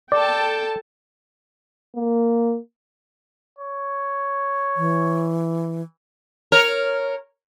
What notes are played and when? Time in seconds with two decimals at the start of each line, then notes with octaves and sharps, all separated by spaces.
0.12 A4 D5 G5 A5
1.96 A#3
3.58 C#5
4.77 E3
6.52 A#4 C#5